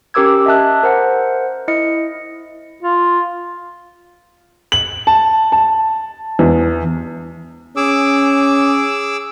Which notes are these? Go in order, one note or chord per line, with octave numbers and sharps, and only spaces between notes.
C#4 G4 A#4 D6 E6 G#6
D#5 E5 A5 F#6
A#4 C5 F#5
E4 D#5 C#7
F4
F#7
A5
A5
E2
C#4 G#4 D6 E6